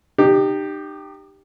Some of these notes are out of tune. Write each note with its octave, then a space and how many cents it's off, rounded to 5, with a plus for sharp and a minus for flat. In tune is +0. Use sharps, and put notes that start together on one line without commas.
D#4 -35 G4 +0